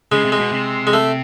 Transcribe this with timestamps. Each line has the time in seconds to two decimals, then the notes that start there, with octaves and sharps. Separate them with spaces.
0.12 C#3 G#3
0.25 C3
0.32 G#3
0.39 B2
0.52 C3
0.87 G#3
0.93 A3